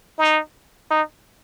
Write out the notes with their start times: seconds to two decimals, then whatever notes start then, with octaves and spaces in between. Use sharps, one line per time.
0.19 D#4
0.91 D#4